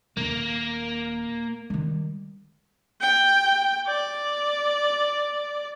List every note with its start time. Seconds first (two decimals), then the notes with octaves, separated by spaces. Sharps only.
0.17 D#1 A#3
1.70 D#3 G3
3.01 G5
3.87 D5